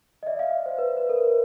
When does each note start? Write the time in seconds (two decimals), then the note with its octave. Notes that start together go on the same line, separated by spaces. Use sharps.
0.23 D#5
0.27 D5 E5
0.39 D#5 F5
0.66 C5
0.78 B4
0.97 B4
1.09 A#4
1.14 B4